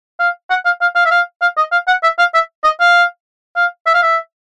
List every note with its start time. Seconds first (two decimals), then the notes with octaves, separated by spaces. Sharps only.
0.19 F5
0.50 F#5
0.65 F5
0.81 F5
0.95 F5
1.06 E5
1.11 F5
1.42 F5
1.57 D#5
1.72 F5
1.88 F#5
2.03 E5
2.19 F5
2.34 E5
2.64 D#5
2.80 F5
3.56 F5
3.86 E5
3.94 F5
4.02 E5